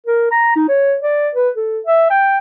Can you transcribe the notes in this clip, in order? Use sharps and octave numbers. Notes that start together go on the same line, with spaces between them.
A#4
A#5
D#4
C#5
D5
B4
A4
E5
G5